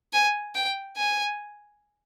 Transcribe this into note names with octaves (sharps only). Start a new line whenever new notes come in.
G#5
G5
G#5